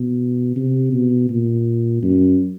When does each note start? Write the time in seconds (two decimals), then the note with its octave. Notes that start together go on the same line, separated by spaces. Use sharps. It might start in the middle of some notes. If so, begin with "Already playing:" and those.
Already playing: B2
0.56 C3
0.93 B2
1.30 A#2
2.03 F#2